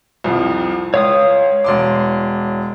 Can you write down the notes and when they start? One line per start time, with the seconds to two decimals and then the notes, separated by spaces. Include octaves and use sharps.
0.24 C2 F2 F3
0.94 C#2 C#5 F5 D#6
1.64 E1 C6 D6